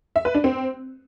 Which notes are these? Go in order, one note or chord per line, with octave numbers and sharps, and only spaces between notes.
E5
B4
D4
C4